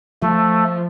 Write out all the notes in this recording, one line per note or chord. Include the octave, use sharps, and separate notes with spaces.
F3 A3